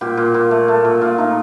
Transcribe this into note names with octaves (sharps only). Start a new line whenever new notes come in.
A#2 G4
A#2
A#2
A3
A3
A#2
A#2 F4
A3 D#4